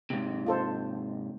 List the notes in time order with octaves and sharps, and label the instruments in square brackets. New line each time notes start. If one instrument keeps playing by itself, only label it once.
[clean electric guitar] G#2 C3
[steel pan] F4 A4 C5